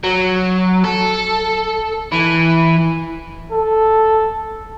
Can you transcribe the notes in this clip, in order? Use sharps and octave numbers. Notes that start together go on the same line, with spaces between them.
F#3
A4
E3
A4